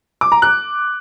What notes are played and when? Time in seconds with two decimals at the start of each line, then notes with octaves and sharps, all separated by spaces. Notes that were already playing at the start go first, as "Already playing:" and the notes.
0.21 D6
0.32 A#5
0.42 F#6